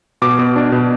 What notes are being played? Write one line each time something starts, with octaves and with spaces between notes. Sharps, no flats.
B2 D6
B2
D4
B2